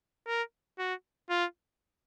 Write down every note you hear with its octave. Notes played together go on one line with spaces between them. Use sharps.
A#4
F#4
F4